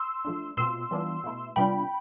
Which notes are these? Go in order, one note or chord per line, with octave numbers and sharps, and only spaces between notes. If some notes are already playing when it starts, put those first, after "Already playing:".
Already playing: C6 E6
F3 A3 D4
B2 A3 C4 F4 C6 E6
E3 G3 B3 D4 F4
B2 A3 E4
C3 G3 B3 D4 F4 G5 B5